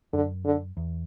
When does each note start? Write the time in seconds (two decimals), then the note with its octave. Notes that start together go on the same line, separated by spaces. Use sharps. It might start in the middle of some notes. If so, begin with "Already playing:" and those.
0.13 F#2 D3
0.45 D3
0.77 E2